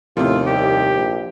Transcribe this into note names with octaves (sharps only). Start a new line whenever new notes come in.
D#2 A2 C3 F3 F4
C2 G4
A#1